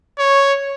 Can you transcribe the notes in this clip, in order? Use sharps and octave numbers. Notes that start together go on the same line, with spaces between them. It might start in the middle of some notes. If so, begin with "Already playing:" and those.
C#5